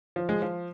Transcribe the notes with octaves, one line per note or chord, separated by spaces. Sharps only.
F3
G#3
F3